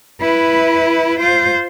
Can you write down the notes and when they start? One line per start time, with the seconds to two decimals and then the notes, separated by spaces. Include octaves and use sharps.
0.21 E4 B4
1.20 F4 C5